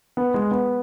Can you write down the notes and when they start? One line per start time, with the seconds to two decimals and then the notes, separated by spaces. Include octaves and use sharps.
0.17 B3
0.34 G#3
0.51 B3